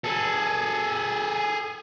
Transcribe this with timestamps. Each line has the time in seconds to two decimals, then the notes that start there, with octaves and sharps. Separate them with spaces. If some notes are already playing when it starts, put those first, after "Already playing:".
0.04 G#4 A4